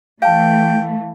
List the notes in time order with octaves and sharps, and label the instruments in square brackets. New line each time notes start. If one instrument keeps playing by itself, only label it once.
[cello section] E3 A3 [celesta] F5 A5 [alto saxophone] G5